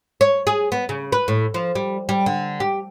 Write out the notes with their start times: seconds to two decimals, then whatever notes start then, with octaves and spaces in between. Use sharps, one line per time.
0.21 C#5
0.47 G#4
0.72 B3
0.89 C#3
1.12 B4
1.28 A2
1.54 F3
1.75 G3
2.09 G3
2.26 D3
2.60 G4